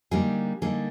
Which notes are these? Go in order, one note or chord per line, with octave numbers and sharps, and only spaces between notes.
D3 G3 A#3 D#4 G#4
D3 G3 A#3 D#4 G#4